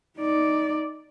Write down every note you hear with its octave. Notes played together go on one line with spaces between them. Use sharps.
D#4 D5